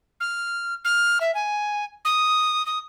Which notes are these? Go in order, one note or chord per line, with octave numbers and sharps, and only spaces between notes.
F6
F6
E5
G#5
D#6
D#6